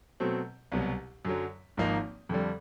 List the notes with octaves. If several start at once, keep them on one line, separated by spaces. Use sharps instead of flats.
B2 F#3 A3 C4
C2 B2 F#3
F#2 D3 F#3
G#1 G#2 F3 A#3 D#4
F2 D3 G3